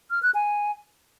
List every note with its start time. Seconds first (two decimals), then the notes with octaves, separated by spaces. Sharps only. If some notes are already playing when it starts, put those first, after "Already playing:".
0.11 F6
0.23 F#6
0.35 G#5